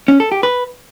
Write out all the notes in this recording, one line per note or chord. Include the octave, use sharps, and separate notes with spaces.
C#4
A4
G4
B4